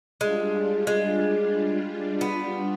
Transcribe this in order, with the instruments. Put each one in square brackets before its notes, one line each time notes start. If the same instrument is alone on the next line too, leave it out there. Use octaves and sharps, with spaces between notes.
[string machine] G3 D4 F4 [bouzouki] G#3
[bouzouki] G#3
B3